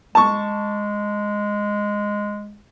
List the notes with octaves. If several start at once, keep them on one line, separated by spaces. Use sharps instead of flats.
G#3 A5 C#6